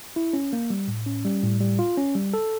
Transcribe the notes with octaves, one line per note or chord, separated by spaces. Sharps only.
E4
C#4
A#3
G3
A2
C#4
G3
A2
G3
F4
C#4
G3
A4